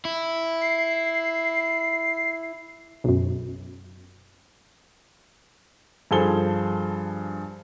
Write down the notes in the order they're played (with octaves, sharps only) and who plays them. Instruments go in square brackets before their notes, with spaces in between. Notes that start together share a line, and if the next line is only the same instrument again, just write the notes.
[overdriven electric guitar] E4
[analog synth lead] C7
[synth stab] B1 F#2
[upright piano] G2 F3 G#4 A4 C5 G7